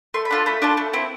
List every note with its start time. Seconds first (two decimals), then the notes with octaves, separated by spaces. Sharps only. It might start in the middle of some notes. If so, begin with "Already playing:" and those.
0.14 A3 C6
0.25 B5
0.31 D4 F4 A4
0.46 A3 B5
0.62 D4 F4 A4
0.77 A3
0.93 C4 E4